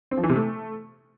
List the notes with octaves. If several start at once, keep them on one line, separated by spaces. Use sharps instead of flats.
C4
F3
E3
C3
A3